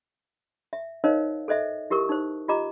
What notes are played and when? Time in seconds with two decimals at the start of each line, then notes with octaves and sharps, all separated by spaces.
0.73 E5
1.04 D#4 A#4 C5 C#5 D#5 F5
1.48 A4 C5 D#5 E5
1.90 E4 G4 A#4 C#6 D#6
2.09 D#4 C5
2.48 F4 G4 D#5 A#5 D6